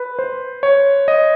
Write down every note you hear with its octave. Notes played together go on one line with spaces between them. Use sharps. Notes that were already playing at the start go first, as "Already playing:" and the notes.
Already playing: B4
C5
C#5
D#5